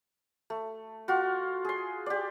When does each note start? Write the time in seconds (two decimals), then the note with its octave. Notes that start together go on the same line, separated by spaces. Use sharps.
0.50 A3
1.08 F4 F#4
1.65 G#4 C6
2.06 G4 D5